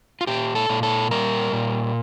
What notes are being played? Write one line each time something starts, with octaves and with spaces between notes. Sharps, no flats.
F4
A#2 G4
A4
A#2
A4
G3 A#4
A#2